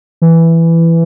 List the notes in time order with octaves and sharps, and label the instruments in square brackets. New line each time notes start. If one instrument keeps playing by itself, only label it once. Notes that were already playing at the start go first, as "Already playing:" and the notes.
[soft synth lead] E3